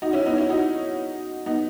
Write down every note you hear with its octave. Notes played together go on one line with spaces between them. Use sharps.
D#4 F#4
C#4 E4
B3 D#4
C#4 E4
D#4 F#4
B3 D#4